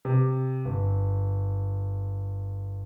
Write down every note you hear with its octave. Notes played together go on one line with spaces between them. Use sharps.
C3
G1